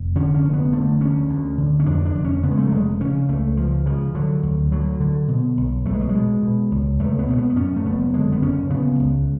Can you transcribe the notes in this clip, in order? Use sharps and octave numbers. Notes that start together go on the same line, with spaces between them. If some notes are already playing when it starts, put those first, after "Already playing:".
Already playing: F1
D3 C#4
C#4
F1
B3
D3 A3
D2 C#4
D2
D3
C#4
F2 D4
D4
F1
C#4
C#3 B3
G#3
A3
F#3
F1 G#3
C#3 C#4
C#2 A3
C#2 F3
C#3 F3
D3 F#3
D2
D2 F#3
D3
B2
B1
B1 A3
G#3
F#3
G#3
B2
B2
C#2
C#2 A3
B3
B2 A3
B3
B3
F#2 C#4
A3
F#1 B3
D3 G#3
B3
F#1 C#4
C#3 B3
C#2